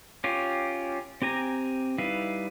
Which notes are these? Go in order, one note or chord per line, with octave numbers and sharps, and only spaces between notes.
C#4 F4 G4
C4 G4 G#5 A#5
G3 D#4 E4 B4 F5